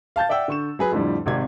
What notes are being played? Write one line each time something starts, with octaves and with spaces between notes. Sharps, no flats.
F5 A5 G6 A6
D5 E5 F#5 G5 E6
D3 C#6 E7
F#3 G#4 B4
F2 A2 D3 G3
G#1 C3 D5 G#6